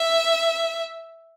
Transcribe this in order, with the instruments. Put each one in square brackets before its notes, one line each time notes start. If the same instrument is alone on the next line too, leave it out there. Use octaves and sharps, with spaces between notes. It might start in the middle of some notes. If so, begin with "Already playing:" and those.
Already playing: [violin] E5